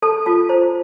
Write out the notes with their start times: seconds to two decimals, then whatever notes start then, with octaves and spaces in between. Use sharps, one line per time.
0.02 A4 A5
0.26 F4 A5
0.49 C5 A#5